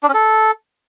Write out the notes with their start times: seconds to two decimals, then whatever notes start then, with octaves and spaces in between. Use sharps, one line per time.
0.03 D4
0.09 C#4
0.14 A4